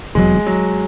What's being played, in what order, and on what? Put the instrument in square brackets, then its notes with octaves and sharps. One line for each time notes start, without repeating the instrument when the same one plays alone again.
[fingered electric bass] F1 E2 B2 F#3 [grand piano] G#3
[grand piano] F#3